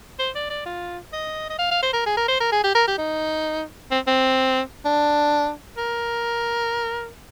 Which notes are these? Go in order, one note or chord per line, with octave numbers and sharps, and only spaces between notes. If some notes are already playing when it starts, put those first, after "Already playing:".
C5
D5
D5
F4
D#5
D#5
F5
F5
C5
A#4
G#4
A#4
C5
A#4
G#4
G4
A#4
G4
D#4
C4
C4
D4
A#4